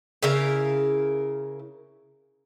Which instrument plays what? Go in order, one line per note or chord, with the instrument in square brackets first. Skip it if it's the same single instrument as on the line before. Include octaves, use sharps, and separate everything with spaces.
[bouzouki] C#3 E4 A#4 F5